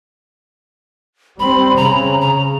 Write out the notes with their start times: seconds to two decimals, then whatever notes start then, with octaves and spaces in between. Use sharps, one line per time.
1.39 G3 C4 B5
1.77 C#3 A#5
2.21 A#5